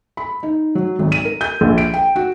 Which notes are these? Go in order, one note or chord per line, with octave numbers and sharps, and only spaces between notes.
B5
D#4
F#3
G#1
D#7
A#4
G6
A#1
D7
G5
F#4